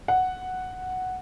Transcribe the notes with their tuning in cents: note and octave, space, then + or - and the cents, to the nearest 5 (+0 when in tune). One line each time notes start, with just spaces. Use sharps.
F#5 +0